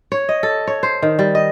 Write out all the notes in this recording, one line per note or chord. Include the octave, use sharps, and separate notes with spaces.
C#5
D#5
A4
C#5
C5
D#3
G3
D#5